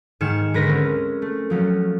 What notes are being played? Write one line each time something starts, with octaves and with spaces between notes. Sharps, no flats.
G#2 D#3 G#5 F6 C#7 E7
D2 G#3 A#4 B4 A#6
C4 C#4
A3
F3 F#3 C#4